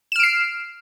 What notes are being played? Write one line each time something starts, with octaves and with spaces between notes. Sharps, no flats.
F6 C7 D7 E7